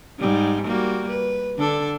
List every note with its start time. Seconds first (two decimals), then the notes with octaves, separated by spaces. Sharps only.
0.19 G#2 G3
0.66 G3 A#3 F#4
1.09 B4
1.58 D3 D4 A4